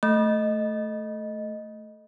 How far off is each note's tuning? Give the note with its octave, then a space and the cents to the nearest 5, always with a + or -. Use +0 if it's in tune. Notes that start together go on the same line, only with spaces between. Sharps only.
A3 +0 D#5 +0